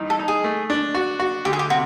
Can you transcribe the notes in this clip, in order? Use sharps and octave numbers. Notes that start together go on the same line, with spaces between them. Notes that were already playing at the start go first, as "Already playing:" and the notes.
Already playing: G2 E3 D#4
A4
D#4
G#4
A3
D4
F#4
F#4
D2 G4
G#4
G4
C3 F#4